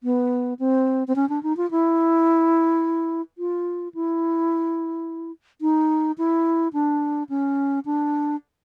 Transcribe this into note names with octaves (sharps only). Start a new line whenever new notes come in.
B3
C4
C4
C#4
D4
D#4
F4
E4
F4
E4
D#4
E4
D4
C#4
D4